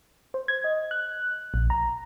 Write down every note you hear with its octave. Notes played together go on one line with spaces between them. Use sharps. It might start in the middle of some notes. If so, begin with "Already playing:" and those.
C5
G#6
D#5
F#6
A#1
A#5